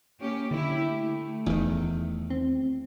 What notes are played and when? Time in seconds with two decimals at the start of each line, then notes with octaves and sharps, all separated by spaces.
0.21 A#3 C#4 G4
0.51 D3 E4 G4
0.87 A3
1.46 D1 E2 D#3
2.30 C4